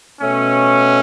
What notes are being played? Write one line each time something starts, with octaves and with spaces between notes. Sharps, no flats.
B2 A3 C#4